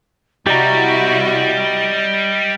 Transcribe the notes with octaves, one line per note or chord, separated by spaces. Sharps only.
C3 G3 E4 F#4 G4 D5 D#5 A#5